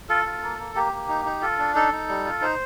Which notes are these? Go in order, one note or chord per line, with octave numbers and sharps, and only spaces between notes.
F4 A4
F4
A#3
A#3
A#3 G4
A#3
D#4
D#4
F4 A4
D4
D#4 A4
D#4
G3
F4
D#4 C5